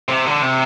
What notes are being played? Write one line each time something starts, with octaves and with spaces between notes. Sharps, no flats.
C3
D3
C3